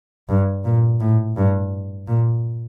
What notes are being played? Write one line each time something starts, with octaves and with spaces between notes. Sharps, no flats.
G2
A#2
A2
G2
A#2